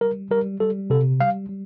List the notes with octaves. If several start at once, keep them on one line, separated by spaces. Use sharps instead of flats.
G3 A#4
G3 A#4
G3 A4
C3 A4
G3 F5
G3